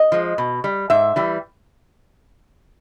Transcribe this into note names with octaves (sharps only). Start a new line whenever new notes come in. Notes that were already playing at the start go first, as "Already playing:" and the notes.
Already playing: D#5
F3 G#3
B2
G3
G#2 E5
E3 G3